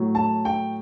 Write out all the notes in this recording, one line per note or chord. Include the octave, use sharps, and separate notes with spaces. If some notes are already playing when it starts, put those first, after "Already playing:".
Already playing: A2 F#3
A5
G5